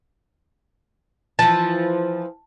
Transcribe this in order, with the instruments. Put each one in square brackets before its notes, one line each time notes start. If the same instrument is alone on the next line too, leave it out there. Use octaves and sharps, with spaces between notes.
[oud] E3 F3 [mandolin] A5